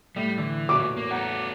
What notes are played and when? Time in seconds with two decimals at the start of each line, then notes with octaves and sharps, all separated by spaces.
0.16 A2 G3
0.38 D3 E3
0.69 E2 A#2 B3 C#4 F#4 D6
0.97 A#3
1.11 B3 A4 F#5 A#5 G6